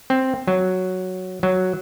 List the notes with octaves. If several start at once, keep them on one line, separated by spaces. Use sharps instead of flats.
C4
F#3
F#3